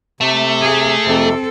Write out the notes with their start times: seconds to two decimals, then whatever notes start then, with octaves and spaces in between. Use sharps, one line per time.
0.21 C3 A3
0.62 G#4
1.05 F2 C3 C4 A4